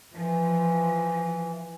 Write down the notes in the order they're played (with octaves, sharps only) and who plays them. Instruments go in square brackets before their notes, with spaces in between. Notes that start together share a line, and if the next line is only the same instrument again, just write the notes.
[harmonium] E3 [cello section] F3